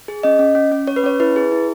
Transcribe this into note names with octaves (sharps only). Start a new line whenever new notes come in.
G#4
C#4 D#5
C#4
C#4
C#4
C#4 C#5
B4
C#4 C#5
E4 B4
G#4
E4